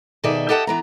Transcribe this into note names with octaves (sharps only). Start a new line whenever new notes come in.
B2 D#3 G#4 A4 D5 E5
G4 A4 D#5 F#5 G5 A5
E3 B3 A#5